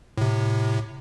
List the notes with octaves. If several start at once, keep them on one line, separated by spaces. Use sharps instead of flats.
A2 C3